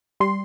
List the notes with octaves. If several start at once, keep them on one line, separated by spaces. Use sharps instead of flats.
G3 C6